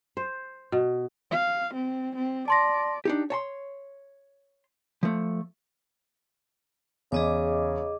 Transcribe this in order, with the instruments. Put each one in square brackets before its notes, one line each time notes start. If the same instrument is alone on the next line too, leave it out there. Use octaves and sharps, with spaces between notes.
[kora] C5
B2
[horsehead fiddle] F5
C4
C4
[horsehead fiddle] D5 [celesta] A5 C6 A#6
[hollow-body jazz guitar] D4 D#4 G4
C#5 A5 C6
F3 A3
[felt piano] E2 [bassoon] C#3 [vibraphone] G#4 D#5 D6